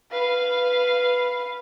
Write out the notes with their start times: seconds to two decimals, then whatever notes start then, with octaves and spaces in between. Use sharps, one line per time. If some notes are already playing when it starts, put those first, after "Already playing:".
0.11 B4 F5